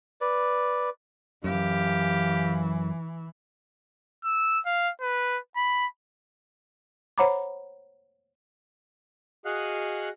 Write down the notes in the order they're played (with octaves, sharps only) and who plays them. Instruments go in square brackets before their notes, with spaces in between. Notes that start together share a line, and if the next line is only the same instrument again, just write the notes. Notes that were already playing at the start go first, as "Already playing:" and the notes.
[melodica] B4 D5
[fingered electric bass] F#2 [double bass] E3 [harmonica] G4 F5
[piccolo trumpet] E6
F5
B4
B5
[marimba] C5 C#5 F#5 A#5 B5 D6
[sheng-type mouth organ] F#4 G#4 D#5 F5 F#5 F#6